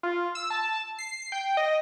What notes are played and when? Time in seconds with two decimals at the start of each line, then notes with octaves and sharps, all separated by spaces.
0.03 F4
0.35 E6
0.50 A5
0.98 C7
1.32 G5
1.57 D#5